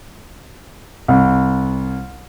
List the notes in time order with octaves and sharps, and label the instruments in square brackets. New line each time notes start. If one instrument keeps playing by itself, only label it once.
[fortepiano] C2